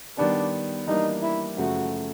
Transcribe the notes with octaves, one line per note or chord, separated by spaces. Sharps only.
D#3 G3 B3 D4
E3 G3 A#3 D4 D#4
E4
F#2 C#3 F3 A3 F#4